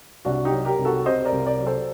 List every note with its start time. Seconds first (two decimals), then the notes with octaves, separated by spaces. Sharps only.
0.25 C2 D4 F#4
0.45 D#4 G4
0.52 F#3
0.65 G4 A#4
0.79 C2
0.85 F#4 A4
1.05 C3 C5 D#5
1.25 A#4 D5
1.32 C2
1.46 A#4 D5
1.60 F#3
1.66 A4 C5